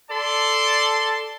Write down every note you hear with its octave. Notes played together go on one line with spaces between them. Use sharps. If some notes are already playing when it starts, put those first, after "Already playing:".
A4 D5 A5 C6